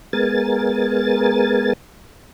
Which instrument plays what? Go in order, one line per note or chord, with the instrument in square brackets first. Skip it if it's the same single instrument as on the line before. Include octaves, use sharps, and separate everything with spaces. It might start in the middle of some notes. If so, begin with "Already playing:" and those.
[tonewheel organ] G#3 B3 A#4 G#5 A6